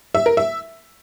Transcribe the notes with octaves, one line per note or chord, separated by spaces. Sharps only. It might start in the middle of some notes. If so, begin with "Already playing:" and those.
E5
A#4
E5